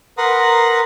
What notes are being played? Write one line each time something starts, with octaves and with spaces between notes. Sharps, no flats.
A#4 B4 F#5 A#5 C6 D#6